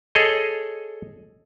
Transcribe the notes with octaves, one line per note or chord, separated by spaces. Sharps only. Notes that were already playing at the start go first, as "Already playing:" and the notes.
G#4 A4 C#5 D#5